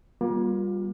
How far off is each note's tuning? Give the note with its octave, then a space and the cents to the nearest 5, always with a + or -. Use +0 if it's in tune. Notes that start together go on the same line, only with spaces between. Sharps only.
G3 +0 A#3 +35 F4 +25